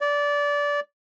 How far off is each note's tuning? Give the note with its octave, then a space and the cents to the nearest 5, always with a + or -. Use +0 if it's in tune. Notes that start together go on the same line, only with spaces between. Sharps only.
D5 -20